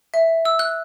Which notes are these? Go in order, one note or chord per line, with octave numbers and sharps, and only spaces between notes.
E5
E6
F#6